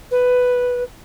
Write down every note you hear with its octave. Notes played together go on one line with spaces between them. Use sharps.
B4